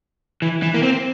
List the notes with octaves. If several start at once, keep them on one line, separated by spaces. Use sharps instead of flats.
E3
E3
A#3
C4